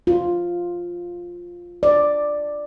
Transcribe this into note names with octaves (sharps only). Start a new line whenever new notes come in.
F4
D5